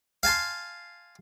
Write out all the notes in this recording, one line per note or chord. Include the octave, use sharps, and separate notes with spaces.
F5 G#5 A5 C6